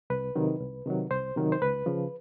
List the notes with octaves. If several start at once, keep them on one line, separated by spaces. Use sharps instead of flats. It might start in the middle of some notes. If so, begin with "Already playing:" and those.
C2 B4
C3 D#3 F#3
C2
C3 D#3 F#3
C2 C5
C3 D#3 F#3
C5
C#2 B4
C#3 F3